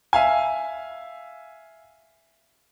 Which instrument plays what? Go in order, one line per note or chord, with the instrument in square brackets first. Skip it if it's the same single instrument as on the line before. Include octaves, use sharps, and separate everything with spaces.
[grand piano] E5 F5 G#5